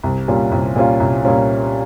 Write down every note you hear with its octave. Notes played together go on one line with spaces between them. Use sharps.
C2
A#2 G3 C#4 F4
C2
A#2 G3 C#4 F4
C2
A#2 G3 C#4 F4